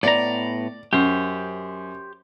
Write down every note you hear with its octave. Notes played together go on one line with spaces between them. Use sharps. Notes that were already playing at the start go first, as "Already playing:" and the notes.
A2 B3 D5 A#5
F#2 G4 C5